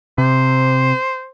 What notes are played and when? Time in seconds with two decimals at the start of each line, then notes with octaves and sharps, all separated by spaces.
0.18 C3 C5